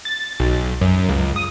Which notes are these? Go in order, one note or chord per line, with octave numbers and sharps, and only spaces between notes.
A6
B1
F#2
C#2
D#6